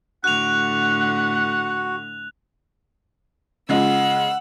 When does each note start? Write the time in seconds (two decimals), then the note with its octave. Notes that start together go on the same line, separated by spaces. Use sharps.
0.24 A2 D3 F#4 F#5 F#6 F7
3.69 C#3 G#3 F4 F#5 E6